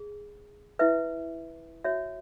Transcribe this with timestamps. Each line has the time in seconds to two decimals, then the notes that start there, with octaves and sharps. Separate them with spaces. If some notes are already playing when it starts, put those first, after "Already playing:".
Already playing: G#4
0.79 E4 B4 E5
1.84 F#4 C#5 E5